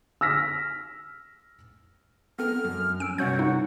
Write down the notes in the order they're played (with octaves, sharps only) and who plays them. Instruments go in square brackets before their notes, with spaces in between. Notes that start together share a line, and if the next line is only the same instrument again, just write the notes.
[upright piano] E6 F6 A#6 B6
[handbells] B3 C4 A4 [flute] F6
[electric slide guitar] F#2
[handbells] C#4 [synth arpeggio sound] E6 D7
[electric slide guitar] G2 C3 [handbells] C#4 C#5 F#5 [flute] F#4 [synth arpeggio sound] G6
[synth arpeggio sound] D#4 [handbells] F#5